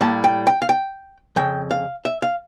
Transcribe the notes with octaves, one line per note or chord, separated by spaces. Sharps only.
A2 G3 A#3 A5
G5
G5
F5
G5
F2 C#3 G5
F5
E5
F5